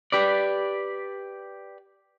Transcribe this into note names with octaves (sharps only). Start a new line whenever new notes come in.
G4 B4 D5